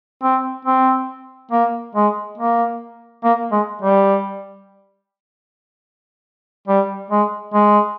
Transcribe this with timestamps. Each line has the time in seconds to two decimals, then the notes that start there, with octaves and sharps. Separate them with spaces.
0.23 C4
0.65 C4
1.51 A#3
1.95 G#3
2.38 A#3
3.24 A#3
3.52 G#3
3.81 G3
6.67 G3
7.10 G#3
7.54 G#3